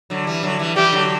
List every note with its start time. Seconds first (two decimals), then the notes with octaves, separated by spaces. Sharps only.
0.10 D3 F#3
0.27 E3 G3
0.43 D3 F#3
0.59 E3 G3
0.76 E3 G3 G4
0.92 D3 F#3